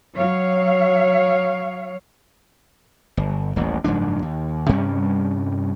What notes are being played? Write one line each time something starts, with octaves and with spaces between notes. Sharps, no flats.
F#3 C#5 F5
G1
D#1 A1
F#1 G#2 F3 D4
D#2
G2 C3 G3 C#4